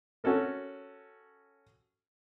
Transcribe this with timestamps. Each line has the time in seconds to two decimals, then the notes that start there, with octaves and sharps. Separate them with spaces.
0.24 C#4 F#4 A4 A#4